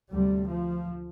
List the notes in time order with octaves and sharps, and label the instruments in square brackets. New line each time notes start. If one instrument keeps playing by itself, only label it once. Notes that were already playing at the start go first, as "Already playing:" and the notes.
[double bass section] D2 C3 G3
F3